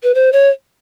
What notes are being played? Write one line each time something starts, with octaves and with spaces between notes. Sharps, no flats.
B4
C5
C#5